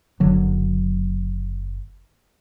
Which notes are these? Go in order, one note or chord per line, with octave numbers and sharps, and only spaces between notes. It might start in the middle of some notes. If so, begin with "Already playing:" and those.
F#1 D3 F#3